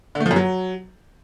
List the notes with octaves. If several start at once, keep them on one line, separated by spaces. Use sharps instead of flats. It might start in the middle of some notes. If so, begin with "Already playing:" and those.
D3
A3
F3
F#2
F#3